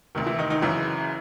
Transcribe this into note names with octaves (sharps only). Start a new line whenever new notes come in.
D2 C3 D#3
E3 E4
D#3 D#4
D#3 D#4
F#1 F#2 C#3 E3 E4